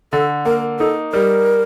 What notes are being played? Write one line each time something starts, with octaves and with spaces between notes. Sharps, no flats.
D3 A4
A#3 A#4
D#4 A4
G3 A#4